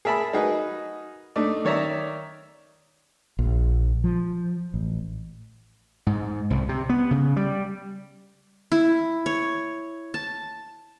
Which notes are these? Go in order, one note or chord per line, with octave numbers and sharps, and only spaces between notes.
G#4 A#4 E5 A5 B5
D#4 F#4 G#4 A#4 B4 D#5
A3 D4 D#4 D5
D#3 C#5 D5 E5 A#5
A#1
F3
A1
G#2
C2
C3
B3
C#3
G3
E4
C#5
A5